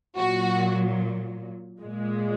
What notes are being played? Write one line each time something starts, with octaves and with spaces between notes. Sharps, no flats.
A#2 F#3 F#4
A#2 G#3